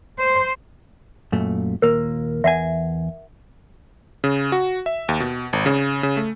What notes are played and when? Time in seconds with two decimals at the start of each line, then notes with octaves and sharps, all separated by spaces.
0.18 C5
1.32 F#2 A#2 A3
1.82 D#2 A#2 A#3 A#4
2.44 E2 E5 F#5 G#5
4.24 C#3
4.52 F#4
4.86 E5
5.09 D#2
5.20 B2
5.53 G#1
5.66 C#3
6.03 C#3
6.17 A3